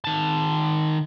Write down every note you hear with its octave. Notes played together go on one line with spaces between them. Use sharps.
D#3 A5